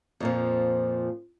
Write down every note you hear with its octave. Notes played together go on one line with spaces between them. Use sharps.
F2 A#2 F3